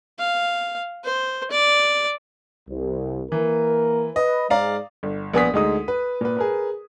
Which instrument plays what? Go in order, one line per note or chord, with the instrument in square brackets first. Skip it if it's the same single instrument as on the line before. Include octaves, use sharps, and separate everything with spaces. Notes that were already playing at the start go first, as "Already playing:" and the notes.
[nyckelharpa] F5
C5
D5
[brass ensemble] C2
[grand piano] E3 [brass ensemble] A#3 A#4
[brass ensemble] B4 [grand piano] D#5
[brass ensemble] G#2 G#3 [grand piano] D5 F5 A#5
[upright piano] G1
A#1 B3 G#5 D#6 B6
D2 G#3 D#4 D#6
B4
A#2 B4
G#4 A#4 B4